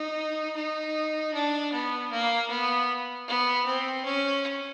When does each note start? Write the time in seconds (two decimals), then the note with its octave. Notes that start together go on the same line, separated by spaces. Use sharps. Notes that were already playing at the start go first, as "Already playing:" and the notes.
Already playing: D#4
0.56 D#4
1.34 D4
1.72 B3
2.11 A#3
2.50 B3
3.28 B3
3.66 C4
4.05 C#4